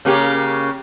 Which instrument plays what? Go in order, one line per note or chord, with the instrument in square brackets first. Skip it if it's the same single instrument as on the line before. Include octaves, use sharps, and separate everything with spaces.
[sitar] C#3 A#3 G4